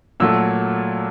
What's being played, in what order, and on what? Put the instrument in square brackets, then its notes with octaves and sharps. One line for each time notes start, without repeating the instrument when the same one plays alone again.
[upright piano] A#2 F#3 A3 E6